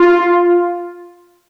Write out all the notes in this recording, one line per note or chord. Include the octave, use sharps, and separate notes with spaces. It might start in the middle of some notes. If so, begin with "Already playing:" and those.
Already playing: F4